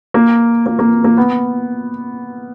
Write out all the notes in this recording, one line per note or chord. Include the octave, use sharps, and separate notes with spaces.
A#3
A#3
A#3
A#3
B3